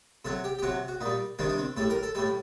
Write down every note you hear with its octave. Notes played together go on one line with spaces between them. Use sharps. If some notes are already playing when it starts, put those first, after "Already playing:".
C3 F#3 A4
G4
G4
C3 F#3 F#4
F#4
A#2 G3 D#4
C3 D#3 G3 D4
D4
C4
A2 G3 A4
A#4
A4
A2 G3 A4